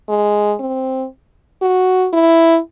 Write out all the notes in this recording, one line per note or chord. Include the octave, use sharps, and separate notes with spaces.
G#3
C4
F#4
E4